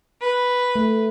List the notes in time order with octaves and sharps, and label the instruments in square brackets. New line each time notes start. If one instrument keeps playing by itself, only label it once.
[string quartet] B4
[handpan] A3